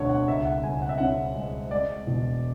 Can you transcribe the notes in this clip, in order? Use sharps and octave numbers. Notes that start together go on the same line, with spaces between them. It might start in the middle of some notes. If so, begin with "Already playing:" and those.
Already playing: E1 D2 D3 G#3 C#5
F#5
C#2 E5
F#5
C#2 G#5
F#5
E5
C#3 F#5
G#3
G#3 D5
E1